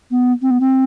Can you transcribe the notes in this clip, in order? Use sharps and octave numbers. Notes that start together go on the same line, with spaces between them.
B3
C4
B3
C4